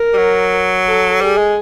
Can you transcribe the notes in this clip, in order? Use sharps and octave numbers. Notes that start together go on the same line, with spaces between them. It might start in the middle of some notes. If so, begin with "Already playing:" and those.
Already playing: A#4
G3
F#3
A4
G3 G#4
G#3